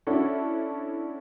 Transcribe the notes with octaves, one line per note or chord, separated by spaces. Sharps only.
C#4 D4 E4 F#4 A4